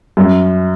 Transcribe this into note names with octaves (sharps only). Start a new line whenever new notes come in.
F#2